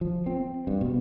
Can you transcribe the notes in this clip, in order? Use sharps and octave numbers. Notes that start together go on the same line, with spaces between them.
F3
C4
G2
B2